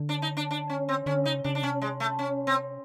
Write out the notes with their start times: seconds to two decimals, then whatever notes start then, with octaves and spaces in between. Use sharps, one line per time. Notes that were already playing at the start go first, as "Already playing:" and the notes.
Already playing: D3
0.09 D4
0.22 D#4
0.37 D4
0.51 D4
0.70 C#4
0.89 C4
1.06 D3 C#4
1.25 C#3 D#4
1.44 C#3 D4
1.55 D4
1.62 C3 C#4
1.82 G#3
2.00 A3
2.19 C#4
2.47 C4